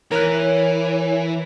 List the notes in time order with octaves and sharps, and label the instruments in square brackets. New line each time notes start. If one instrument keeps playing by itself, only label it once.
[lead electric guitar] E3 [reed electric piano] A#4 F#6 [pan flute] C#5